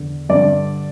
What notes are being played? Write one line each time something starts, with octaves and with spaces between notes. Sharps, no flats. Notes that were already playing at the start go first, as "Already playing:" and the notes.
Already playing: E2 D3
G2 D3 D5